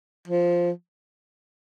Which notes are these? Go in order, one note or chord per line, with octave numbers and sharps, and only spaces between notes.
F3